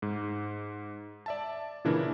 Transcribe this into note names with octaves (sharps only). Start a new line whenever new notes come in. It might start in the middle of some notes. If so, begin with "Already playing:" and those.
G#2
D5 E5 A5
A#2 C#3 E3 D4 E4 A#4